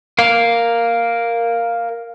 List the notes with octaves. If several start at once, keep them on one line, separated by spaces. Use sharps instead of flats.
A#4 F5